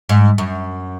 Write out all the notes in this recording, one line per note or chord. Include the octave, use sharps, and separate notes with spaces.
G#2
F#2